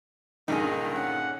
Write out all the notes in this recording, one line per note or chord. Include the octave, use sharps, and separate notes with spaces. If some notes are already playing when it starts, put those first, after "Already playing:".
C#2 G2 A#2 D3 D#3 D#4 G#4
C#4 F#5